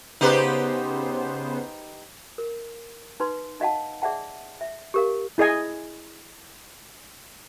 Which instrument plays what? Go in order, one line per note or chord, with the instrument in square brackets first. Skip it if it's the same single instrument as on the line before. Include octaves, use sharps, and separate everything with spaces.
[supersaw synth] C#3 B3 C5 [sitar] D#4 G4 B4
[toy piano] A#4
D#4 B4 C6
D#4 D#5 F5 F#5 A5
G#4 D5 E5 F#5 A5
E5
G4 A#4 F5
[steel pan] E4 G#4 D#5 G#5